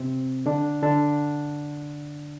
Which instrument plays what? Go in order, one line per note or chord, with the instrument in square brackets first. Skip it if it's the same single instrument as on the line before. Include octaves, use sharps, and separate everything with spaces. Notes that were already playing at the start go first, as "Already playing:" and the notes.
Already playing: [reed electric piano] C3 C4
D3 D4
D3 D4